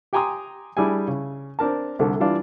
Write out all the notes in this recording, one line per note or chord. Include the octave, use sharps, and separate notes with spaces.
G4 G5 G#5 A#5 C6 D#6
G3 D4 E4 G#4 G#5
C#3
C4 D4 A#4 A5
C2 D3
E3 G3 D4 F4